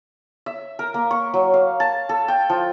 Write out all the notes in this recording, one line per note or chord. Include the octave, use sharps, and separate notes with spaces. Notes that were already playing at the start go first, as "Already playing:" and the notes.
E5
A#4
A#3
C#6
F#3
F5
A5
A4
G5
F3